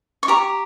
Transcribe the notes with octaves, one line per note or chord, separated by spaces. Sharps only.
C#6
G4 A#5